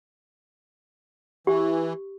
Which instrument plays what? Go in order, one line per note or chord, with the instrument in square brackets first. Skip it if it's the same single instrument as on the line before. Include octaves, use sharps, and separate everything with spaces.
[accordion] E3 [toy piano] G4